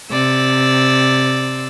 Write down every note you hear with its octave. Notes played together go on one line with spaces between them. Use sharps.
C3 D5 E6